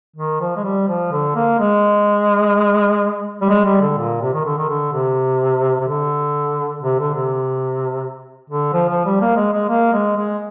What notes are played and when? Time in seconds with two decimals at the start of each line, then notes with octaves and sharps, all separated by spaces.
0.16 D#3
0.41 F3
0.56 G#3
0.64 G3
0.88 F3
1.11 D3
1.35 A#3
1.59 G#3
3.41 G3
3.49 G#3
3.65 G3
3.81 D3
3.97 A#2
4.22 C3
4.34 D#3
4.44 D3
4.58 D#3
4.68 D3
4.93 C3
5.80 C3
5.88 D3
6.82 C3
6.99 D3
7.14 C3
8.50 D3
8.73 F3
8.89 F3
9.05 G3
9.21 A#3
9.36 G#3
9.52 G#3
9.69 A#3
9.92 G#3
10.16 G#3